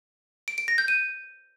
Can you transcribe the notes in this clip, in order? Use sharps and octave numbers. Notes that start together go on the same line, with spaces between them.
D7
D7
A#6
G6
D#7